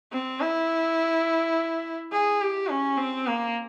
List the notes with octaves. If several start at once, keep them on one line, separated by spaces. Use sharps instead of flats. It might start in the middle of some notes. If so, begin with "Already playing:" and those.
C4
E4
G#4
G4
C#4
C4
A#3